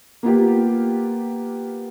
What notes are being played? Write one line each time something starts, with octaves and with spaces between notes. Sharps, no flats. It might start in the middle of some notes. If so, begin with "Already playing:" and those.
A#3 B3 F4 G4